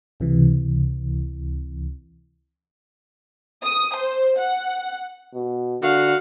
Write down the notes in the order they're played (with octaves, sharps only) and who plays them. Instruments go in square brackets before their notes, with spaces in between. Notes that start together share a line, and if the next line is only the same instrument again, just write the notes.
[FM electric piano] C#2 C3 E3
[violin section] D#6
C5
F#5
[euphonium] B2
[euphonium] D3 [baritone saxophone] F#4 [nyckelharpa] F5